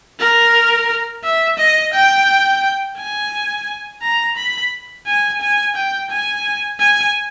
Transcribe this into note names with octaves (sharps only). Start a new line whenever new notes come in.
A#4
E5
D#5
G5
G#5
A#5
B5
G#5
G#5
G5
G#5
G#5